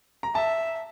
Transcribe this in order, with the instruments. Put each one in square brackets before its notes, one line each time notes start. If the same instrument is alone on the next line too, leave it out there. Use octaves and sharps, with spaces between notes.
[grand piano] A#5
[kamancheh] E5 [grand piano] A5